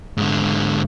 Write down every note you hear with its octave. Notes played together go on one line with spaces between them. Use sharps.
G#2 D3